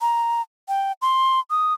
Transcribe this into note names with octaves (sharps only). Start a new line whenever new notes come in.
A#5
G5
C6
D#6